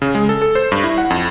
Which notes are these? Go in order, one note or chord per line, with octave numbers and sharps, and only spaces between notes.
C#3
G#3
A4
A4
C5
G2
E4
F#5
F2